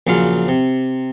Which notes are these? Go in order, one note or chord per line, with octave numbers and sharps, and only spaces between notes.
A#1 C#3 F#3 F4 F5
C3